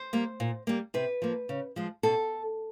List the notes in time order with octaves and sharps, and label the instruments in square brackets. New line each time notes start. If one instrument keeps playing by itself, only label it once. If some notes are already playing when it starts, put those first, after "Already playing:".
Already playing: [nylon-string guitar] C5
G3 A#3
A#2
G3 A#3
C3 B4
F3 A#3
C#3
F3 G#3
B2 A4